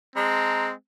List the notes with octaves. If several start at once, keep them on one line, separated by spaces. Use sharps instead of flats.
G#3 C4 A5 A#5